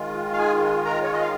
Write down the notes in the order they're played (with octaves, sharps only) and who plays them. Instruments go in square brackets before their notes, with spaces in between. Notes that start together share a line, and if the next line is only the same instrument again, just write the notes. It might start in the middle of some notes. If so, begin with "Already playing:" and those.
Already playing: [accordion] D#3 G#3 F4
F5
G#4 G#5
A#4 A#5
C#5
D#5
F5